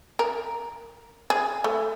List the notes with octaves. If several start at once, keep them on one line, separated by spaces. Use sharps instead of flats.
A#4
G#4
A3